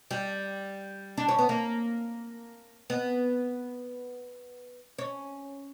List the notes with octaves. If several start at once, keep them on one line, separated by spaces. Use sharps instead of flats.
G3
D4
C#4
B3
A#3
B3
C#4